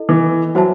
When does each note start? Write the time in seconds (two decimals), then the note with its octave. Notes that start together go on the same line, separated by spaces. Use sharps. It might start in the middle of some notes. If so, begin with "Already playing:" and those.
Already playing: E4 A4 D#5
0.09 E3
0.55 F#3 F#4 C5 E5 A5